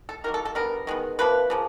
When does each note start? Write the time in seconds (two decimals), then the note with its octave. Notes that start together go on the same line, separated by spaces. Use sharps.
0.09 A4
0.24 D#3 F#3 A#3 A#4
0.34 A4
0.45 A4
0.55 D3 G3 B3 A#4
0.87 D#3 G#3 B3
1.19 C3 F3 A#3 B4
1.50 C#3 F3 A#3